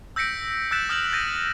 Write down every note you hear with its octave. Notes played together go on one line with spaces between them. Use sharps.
E6 G6 A#6 B6 C#7 D7
E6 F#6 G6 A6 B6 E7
D#6 F6 G6 E7 F#7
G6 A6 A#6 D#7